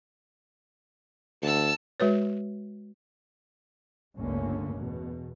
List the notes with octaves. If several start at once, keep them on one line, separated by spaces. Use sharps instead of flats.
D2 A5 E6
G#3 F#4 B4 C#5
G1 C#2 D3 A3 A#3 C#4
E2 B2